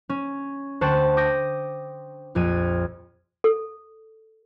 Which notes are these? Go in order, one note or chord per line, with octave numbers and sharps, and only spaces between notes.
C#4
D2 C5 F#5 G5 A5 C#6
D6 D#6 G6 A#6
A#1 F2 G#6 D#7
A4